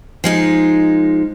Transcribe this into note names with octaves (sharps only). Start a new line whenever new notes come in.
F3 G#3 D#4